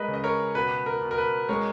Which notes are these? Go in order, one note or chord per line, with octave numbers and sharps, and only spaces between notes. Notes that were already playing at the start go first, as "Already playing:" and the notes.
Already playing: G#3 A#4 B4 D#5
C#3
D#5
A#4 C#5
B2 B4
A#4
B2
A#4
B4
G#3 A#4 C#5